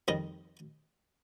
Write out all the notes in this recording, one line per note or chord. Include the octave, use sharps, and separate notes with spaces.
F2 D#3 G3 D#5